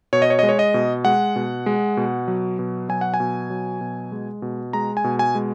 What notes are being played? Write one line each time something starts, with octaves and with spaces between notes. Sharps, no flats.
B2 C#5
D#5
C#5
D#5
G#3
C#5
D#5
B2
G#3 F#5
B2
G#3
B2
F#3
B2
F#3 G#5
F#5
G#5
B2
F#3
B2
G#3
B2
G#3 A#5
G#5
B2
G#5
G#3